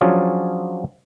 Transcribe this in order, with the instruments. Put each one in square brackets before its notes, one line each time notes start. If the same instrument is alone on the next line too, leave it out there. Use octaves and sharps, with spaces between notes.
[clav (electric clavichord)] F3 F#3 C#4 D4 F4 G#4